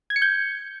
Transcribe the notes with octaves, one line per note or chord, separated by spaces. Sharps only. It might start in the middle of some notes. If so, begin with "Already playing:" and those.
G#6
C#7
G6